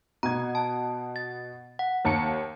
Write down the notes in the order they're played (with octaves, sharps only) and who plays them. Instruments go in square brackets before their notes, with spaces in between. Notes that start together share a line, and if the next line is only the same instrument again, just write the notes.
[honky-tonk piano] B2 G#6 [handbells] A#5
[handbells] A5
A6
F#5
[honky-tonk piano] D#2 A5 C#7